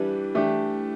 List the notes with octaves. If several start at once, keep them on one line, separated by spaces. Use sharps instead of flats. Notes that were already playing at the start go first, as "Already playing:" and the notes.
Already playing: E3 G3 D4 G4 B4
E3 A3 D4 G4